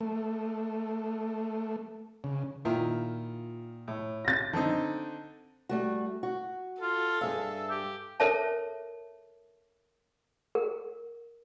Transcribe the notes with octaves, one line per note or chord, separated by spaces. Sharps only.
A3
C#3
A#2 D#3 E4 F4
A2
A6 A#6
D3 C4 D#4 A5
G3 A3 F#4
F#4
F4 A4
G2 G#4 E5 F5
G4
A4 A#4 C5 C#5 E5 A5
A#4